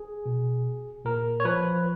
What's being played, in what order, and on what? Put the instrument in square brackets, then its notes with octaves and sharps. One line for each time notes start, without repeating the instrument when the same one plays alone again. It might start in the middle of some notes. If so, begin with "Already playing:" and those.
Already playing: [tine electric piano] G#4
B2
A#2 A#4
C#5
F3 B4